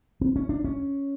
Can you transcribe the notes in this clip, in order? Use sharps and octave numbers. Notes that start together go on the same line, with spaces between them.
C4
C#4
D4
C#4